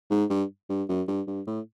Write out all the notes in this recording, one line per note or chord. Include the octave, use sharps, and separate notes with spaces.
G#2
G2
G2
F#2
G2
G2
A2